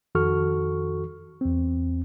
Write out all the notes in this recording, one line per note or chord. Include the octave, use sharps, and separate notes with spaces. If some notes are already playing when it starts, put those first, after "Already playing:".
F2 D#3 F#4 A4 C#6 F6
E2 C4